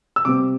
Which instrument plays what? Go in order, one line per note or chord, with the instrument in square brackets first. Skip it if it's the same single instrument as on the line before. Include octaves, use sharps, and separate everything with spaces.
[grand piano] E6
C3 G3 C4 D6